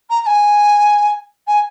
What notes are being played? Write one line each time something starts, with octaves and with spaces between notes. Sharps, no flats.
A#5
A#5
G#5
G#5